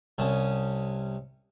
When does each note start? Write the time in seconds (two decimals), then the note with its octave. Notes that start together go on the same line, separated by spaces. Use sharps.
0.18 C2 C#4 A5 D#6